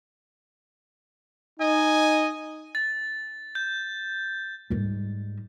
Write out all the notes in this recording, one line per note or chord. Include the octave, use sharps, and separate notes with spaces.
D#4 D#5 G#5
A6
G6
G#2 G3